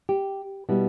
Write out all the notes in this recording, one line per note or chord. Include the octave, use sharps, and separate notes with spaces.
G4
B2 G3 B3 E4